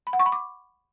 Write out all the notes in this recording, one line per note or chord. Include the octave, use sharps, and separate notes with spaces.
B5
F#5
C#6
B5
D6